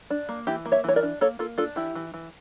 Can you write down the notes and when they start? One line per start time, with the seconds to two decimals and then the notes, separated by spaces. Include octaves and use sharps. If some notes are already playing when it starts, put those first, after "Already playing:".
0.10 D4
0.29 A#3
0.47 E3 E4 G4
0.66 A#3
0.72 C#5 E5
0.84 E3 C#5
0.96 A#4 D5
1.03 D4
1.21 A#3 A4 C#5
1.39 A#3 F4 A4
1.58 D4 F4 A4
1.76 E3 E4 G4
1.95 E3
2.14 E3